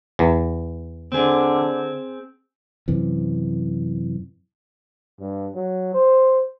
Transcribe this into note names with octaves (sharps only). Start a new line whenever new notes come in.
E2
D3 C4 G#4
F#2 C3 E3
G2
F#3
C5